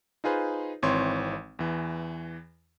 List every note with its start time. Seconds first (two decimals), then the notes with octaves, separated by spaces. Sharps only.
0.24 D#4 F4 G#4 B4 C5
0.83 G#1 E3 C4 C#5 C6
1.59 E2 E3